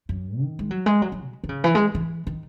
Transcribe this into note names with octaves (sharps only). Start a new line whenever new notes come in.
F#2
D#3
G#3
F#3
G#3
F#3
F#3
B2
D#3
C#3
E3
G#3
E3
D#3